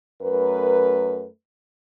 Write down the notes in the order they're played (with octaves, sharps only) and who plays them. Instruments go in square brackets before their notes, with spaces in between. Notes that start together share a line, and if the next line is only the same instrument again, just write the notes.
[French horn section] F#2 A3 A#4 B4